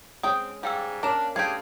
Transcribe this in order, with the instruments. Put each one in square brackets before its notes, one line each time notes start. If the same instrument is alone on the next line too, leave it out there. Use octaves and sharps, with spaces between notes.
[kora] G#3 C#4 [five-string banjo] C4 G5 [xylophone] D#6
[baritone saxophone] G#2 [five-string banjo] G3 [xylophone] F5 G5 E6
[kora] A#3 C#4 [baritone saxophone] D4 [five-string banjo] A#4 [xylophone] D6 E7
[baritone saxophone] G2 [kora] A3 D#5 F5 [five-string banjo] G4 G#4 [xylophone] G#6